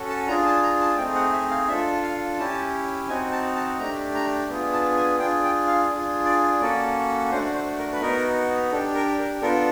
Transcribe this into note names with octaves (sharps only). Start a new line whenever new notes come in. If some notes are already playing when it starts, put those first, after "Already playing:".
Already playing: C#4 F#4 A4
A5
D4 F4 G#4 A#5
A5
A#5
A5
A3 C4 D#4 G#4 G5
F#5
E5
F5
D4 F4 A4 E5
F5
C#4 E4 G4 A5
C4 D#4 F#4 G#5
A5
A5
A3 D4 G4 A#5
A#5
B3 D4 F4 G#4
A5
G#5
D4 F4 G#4 G5
G5
F5
D4 F4 G#4
D5
A#3 C#4 F#4 A4 D5
A3 D4 F#4 C5
C5
A#4
B4
B3 D#4 F#4 A#4
D4 G4 A4
A#4
A#4
B3 D4 F4 A4 A#4